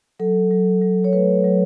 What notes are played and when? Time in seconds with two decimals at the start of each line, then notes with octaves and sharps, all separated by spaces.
0.19 F#3 A4
0.51 F#3
0.82 F#3
1.04 C#5
1.13 A3 B4
1.44 F#3